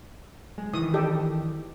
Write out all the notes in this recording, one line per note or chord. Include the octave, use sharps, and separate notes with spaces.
G#3
D#3 E3 D#6
G4 A4 D#5